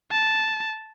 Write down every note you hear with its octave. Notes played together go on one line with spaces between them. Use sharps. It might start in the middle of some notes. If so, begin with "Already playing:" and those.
A5